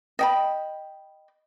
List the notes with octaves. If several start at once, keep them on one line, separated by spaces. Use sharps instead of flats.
D#5 G5 B5